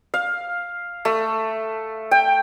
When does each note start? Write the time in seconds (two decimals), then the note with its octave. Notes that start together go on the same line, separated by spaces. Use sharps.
0.14 F5
1.05 A3
2.11 G5